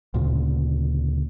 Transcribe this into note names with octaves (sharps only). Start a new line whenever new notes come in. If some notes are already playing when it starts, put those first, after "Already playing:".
D2 A#2 C#3